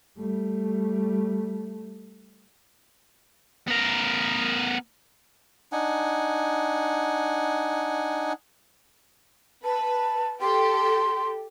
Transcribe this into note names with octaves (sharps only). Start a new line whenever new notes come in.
G3 A3
B3 A#4
D4 D#4 F#5 G#5
B4 A5
G4 A4 C6